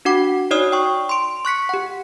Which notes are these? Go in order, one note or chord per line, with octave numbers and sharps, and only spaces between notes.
D4 F#4 F#5 D6
D#4 F#4 C#5 D5 D#6 F6
G5 C#6
C6 D7
C#6 F#6 B6 C#7
G4 F#5